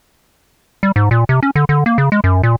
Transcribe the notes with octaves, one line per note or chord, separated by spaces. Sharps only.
G3
G#2
A#2
C3
C#4
D3
D3
A#3
C#3
G#3
F#2
A#2